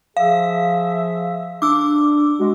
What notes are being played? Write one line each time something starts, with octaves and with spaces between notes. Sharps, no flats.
F3 G#4 E5 F5
D4 D6 E6
G#3 F#4